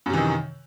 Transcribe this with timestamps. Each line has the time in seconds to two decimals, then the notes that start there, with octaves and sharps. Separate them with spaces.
0.06 F#2
0.10 C3
0.13 E3
0.17 D#3